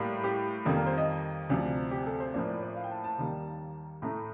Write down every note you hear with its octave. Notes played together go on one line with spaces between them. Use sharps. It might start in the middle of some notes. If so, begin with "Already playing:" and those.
Already playing: A2 G3 A#3
G4
F2 D#3 G3 A#3 A4
A#4
C5
D#5
D2 C3 F3 D5
G4
A4
C5
A2 F3 A#3 D5
D5
D5
F5
G5
A5
A5
D#2 D#3 G3 A#3
A2 A3 A#5